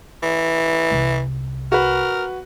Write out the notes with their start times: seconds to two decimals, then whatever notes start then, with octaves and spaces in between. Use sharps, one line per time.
0.23 E3
0.91 C2
1.72 F#4 A#4 B4